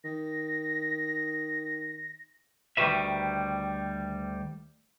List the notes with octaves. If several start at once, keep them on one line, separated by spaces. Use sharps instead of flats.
D#3 A#6
D2 D#3 G3 F#4 B4 E5